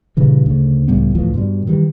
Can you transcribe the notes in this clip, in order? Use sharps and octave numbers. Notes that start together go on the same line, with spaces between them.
G2 A#2 C#3 E3
D2 C#3
C#2 A2 G3 B3
D2 A2 E3 F3
G2 B2 G3
D#3 E3 G3